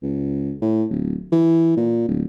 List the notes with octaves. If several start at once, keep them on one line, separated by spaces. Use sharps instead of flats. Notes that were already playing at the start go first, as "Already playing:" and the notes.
C#2
A2
D1
E3
A#2
D1